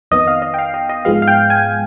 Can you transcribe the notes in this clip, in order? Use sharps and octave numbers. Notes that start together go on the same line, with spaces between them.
F2 D#3 B3 D#5
F5
D#5
G5
F5
D#5
D#5
G#2 F3 G#3 B3 F5
F5
G5
G#5